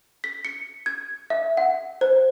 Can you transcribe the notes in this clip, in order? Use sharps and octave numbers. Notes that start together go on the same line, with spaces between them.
B6
C#7
G#6
E5
F#5
C5